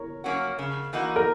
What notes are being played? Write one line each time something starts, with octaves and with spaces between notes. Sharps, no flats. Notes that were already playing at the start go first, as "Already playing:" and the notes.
Already playing: A#4 C#5
F#3 A#3 C#4 F#4
C#3
E3 A#3 D#4 F#4
A#4